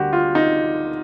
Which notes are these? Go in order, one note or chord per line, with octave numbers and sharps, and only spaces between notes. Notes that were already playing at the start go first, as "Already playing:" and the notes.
Already playing: D2 D3 G3 A#3 F#4 G4
F4
D#4